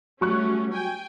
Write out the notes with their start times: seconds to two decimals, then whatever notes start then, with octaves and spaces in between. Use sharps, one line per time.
0.21 F#3 G3 A3 C#4 C#6 F#6
0.72 G5 G#5